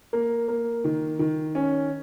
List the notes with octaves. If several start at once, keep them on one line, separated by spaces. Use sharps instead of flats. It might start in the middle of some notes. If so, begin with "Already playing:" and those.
A#3
A#3
D#3
D#3
C#4